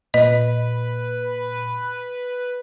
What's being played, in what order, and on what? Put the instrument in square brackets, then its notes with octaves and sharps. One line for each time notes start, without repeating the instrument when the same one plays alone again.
[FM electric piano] A#2 [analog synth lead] B4 [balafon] D#5